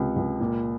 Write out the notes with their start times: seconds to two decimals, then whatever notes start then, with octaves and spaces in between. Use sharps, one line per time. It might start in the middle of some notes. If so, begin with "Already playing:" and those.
Already playing: C#2 C3
0.16 C#2
0.40 A#2